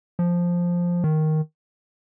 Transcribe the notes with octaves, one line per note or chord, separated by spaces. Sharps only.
F3
D#3